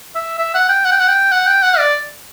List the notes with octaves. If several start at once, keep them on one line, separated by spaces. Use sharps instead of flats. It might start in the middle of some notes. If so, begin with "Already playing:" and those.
E5
E5
F#5
G5
F#5
G5
F#5
G5
F#5
G5
F#5
D5